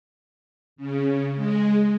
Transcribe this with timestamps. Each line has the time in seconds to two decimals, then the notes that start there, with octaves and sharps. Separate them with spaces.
0.76 C#3
1.34 G#3